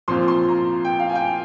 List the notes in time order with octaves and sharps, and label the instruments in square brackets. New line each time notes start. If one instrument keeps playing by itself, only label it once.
[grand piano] A#2 F3 C4 F4 [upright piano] C6
[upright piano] C6
A#5
G5
F5
G#5
G5